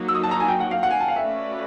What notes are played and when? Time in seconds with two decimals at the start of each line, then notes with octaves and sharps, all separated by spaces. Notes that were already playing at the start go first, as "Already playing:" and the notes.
Already playing: F#3 A#3 D#4 F#4
0.08 E6
0.15 D#6
0.23 A5
0.31 A#5
0.40 G#5
0.48 G5
0.60 F#5
0.71 F5
0.83 F#5
0.91 G#5
1.00 A5
1.08 F5
1.16 A3 C#4 F#4 B4 D5 E5